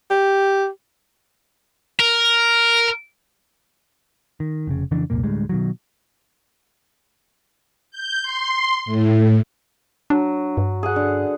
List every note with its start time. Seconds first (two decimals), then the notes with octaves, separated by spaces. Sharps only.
0.11 G4
1.99 A#4
4.40 D#3
4.67 F1 C#3
4.91 F2 C#3 E3 D4
5.10 C2 F2 A#2 A#3
5.23 D2 A2 G3 G#3
5.49 B2 D#3 F#3
7.91 G6
8.23 C6
8.86 A2
10.10 F#3 D4
10.57 G2
10.83 G#4 F#5
10.96 D3